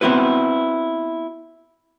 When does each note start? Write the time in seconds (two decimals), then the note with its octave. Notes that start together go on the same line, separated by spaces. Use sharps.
0.01 B3 C4 E4 F#4 B4